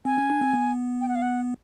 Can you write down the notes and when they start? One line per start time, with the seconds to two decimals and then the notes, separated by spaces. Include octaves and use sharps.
0.05 C4 G#5
0.18 C#4
0.30 D4
0.41 C4
0.54 B3
1.01 G5
1.09 F#5
1.15 F5
1.22 F#5